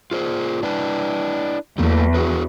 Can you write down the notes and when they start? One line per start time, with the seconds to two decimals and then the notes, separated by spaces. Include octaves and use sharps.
0.11 F4 G#4 C5
0.63 D4 E4 B4
1.78 E2 F#3 A3 A#3
2.14 F#4 G#4 B4